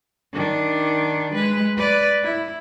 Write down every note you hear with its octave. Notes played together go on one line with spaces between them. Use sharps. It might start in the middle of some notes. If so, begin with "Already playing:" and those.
D#3 D4
G#3 B4
B4 D5
E4